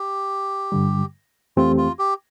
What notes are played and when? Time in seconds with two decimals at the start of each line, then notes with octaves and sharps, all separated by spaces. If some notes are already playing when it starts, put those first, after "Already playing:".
Already playing: G4
0.72 G2 D3 G3
1.57 F2 E3 A3 C4 F4 G4
1.77 F4
1.99 G4